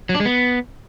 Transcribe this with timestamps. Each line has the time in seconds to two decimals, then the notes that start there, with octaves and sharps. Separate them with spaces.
0.09 F#3
0.15 D4
0.20 G#3
0.25 B3